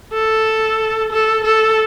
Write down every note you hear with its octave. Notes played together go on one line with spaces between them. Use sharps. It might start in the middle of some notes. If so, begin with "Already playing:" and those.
A4
A4
A4